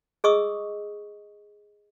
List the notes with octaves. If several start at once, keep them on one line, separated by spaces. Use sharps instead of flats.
G#4 D#5 C#6 D#6 E6